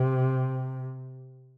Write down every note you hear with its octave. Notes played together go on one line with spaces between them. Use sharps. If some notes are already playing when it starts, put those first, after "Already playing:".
Already playing: C3